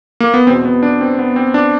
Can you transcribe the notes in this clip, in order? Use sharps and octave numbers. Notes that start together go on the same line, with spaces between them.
A#3
B3
E2 B2 C4
B3
D4
C4
B3
C4
D4